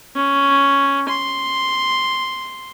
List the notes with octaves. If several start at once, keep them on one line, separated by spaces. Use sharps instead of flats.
C#4
C6